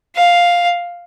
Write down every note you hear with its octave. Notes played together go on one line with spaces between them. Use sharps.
F5